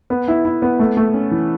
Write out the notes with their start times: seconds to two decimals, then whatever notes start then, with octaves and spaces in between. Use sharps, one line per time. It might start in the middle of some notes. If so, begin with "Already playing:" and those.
0.10 B3
0.28 E4
0.45 E4
0.62 B3
0.79 A3
0.97 A3
1.14 C#4
1.31 E3